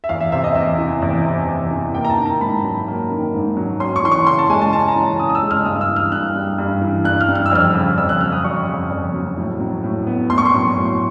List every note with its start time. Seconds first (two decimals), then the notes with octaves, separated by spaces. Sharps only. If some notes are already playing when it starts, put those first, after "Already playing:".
0.04 E5
0.09 E2 F5
0.21 E5
0.32 C3 E5
0.44 D#5
0.55 E2 E5
0.78 E3
1.02 E2
1.25 C3
1.48 E2
1.71 E3
1.94 A#3 G5
2.05 A#5
2.10 A5
2.18 D#3
2.26 A#5
2.41 G#2 B5
2.64 F#3
2.88 A#3
3.11 D#3
3.34 G#2
3.57 F#3
3.80 C#4 C6
3.96 C#6
4.04 E3 C6
4.12 C#6
4.27 C#3 C6
4.38 A5
4.50 G#3 G#5
4.62 A5
4.73 C#4 A5
4.88 A#5
4.96 E3
5.19 C#3 D#6
5.30 D#6
5.35 E6
5.42 G#3
5.51 F6
5.66 G2 D#6
5.81 E6
5.89 E3
5.96 F6
6.12 G2 F#6
6.35 G3
6.58 G2
6.82 E3
7.05 G2 F#6
7.21 F6
7.28 G3
7.35 F6
7.46 E6
7.52 F2 F6
7.75 C#3
7.98 F2 E6
8.09 F#6
8.21 F#3 F6
8.32 D#6
8.44 F2 C#6
8.68 C#3
8.91 F2
9.14 F#3
9.37 A2
9.60 F#3
9.84 A2
10.07 B3
10.30 A2 C6
10.38 C#6
10.45 C6
10.53 F#3
10.76 A2